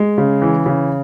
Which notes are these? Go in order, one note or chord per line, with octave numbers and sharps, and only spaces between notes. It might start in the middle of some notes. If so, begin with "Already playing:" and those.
Already playing: G#3
C#3
E3
C#3